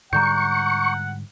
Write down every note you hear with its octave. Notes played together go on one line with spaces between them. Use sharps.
G#2 D3 G3 F#5 A#5 C#6 G6